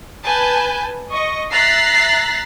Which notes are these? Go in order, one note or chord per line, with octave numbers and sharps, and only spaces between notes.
B4 G#5 A5 G6
D#5 C#6
E5 A#5 F#6 A6 B6 C7